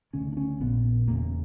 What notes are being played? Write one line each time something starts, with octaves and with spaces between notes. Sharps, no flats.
D2 C#3 C#4
D4
C#4
A#1 A#2 B3
E1 E2 C#3 A#3